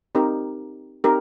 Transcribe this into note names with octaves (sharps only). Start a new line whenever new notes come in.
C4 D#4 G4 A#4
C4 D#4 G4 A#4